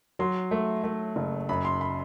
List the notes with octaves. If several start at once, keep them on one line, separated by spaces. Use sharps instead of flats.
F#3 C6
A3
A3
F#1
F#2 B5
C6
B5